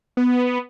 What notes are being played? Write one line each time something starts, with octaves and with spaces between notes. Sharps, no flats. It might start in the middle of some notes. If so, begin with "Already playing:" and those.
B3